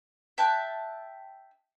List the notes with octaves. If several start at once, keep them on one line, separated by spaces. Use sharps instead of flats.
E5 G5 A5 F#6